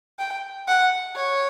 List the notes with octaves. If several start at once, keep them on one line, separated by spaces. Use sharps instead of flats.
G5
F#5
C#5